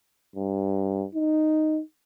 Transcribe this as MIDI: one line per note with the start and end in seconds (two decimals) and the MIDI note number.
0.36 1.05 43
1.15 1.80 63